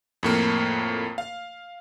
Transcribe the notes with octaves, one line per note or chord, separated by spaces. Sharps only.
F2 A2 A#3
F5